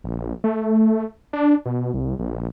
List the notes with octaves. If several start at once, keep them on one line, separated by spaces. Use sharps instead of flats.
A#1
A3
D4
B2
C2
A#1